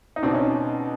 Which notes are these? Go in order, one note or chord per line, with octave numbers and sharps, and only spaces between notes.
D#4
B2 C4 D4
C#4 D#4